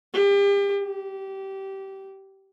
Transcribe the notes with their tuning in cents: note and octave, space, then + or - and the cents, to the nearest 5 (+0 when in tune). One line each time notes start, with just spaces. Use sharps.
G4 +35
G4 -20